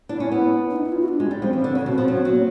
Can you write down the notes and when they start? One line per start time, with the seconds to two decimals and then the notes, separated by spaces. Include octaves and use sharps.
0.09 D4 E4
0.20 C#4
0.32 B3
0.70 D4
0.76 D#4
0.84 E4
0.92 F4
1.01 F#4
1.08 D4
1.20 G#3
1.25 C#4
1.31 G3
1.42 F3 C4
1.53 E3
1.59 C4
1.64 D3
1.75 C#3
1.86 B2
1.92 C4
1.98 F3
2.08 F#3 C#4
2.17 C4
2.25 F#3 B3
2.33 A#3